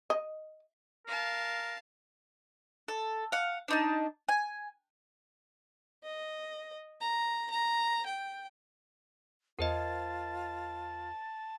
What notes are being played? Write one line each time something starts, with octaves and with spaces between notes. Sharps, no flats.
D#5
A#4 F5 A5
A4
F5 F#5
D4 D#4 A5
G#5
D#5
A#5
A#5
G5
E2 F4 A#4 C5 D#5 A5